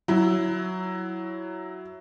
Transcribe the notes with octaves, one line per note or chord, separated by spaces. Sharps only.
F#3 E4